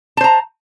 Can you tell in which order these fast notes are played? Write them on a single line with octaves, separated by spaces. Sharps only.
A5 C5 A#5